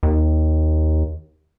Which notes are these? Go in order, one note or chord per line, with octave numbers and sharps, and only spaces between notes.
D#2